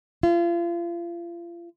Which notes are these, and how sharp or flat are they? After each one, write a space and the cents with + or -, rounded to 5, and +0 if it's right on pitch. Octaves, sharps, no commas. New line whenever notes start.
F4 -35